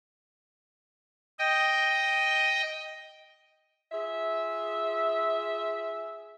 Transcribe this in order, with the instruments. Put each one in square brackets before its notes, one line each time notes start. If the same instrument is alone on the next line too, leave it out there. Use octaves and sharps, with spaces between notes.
[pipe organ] D#5 G5
[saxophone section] F4 G#4 E5